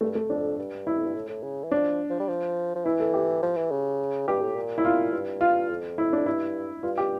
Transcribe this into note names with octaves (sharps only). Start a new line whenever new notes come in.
G2 A3
A3
F2 D4
G2
E4
F2
G2
A2
A2
C#3
E3
F3 D4
F3
G3
F3
F3
E3 E4
A4
G4
F3
E3
C#3
G2 G4
A2
A#2
E4
F4
G2
F4
F2
E4
D4
F2
G2 E4
G2 F4
G4